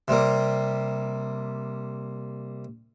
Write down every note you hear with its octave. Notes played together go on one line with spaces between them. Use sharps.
C3 G3 A#3